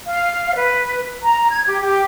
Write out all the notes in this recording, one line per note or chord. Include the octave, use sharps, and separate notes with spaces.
F5
B4
A#5
G#6
G4
G4